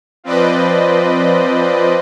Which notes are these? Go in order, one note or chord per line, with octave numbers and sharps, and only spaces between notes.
F3 C4 B4 D5 D#5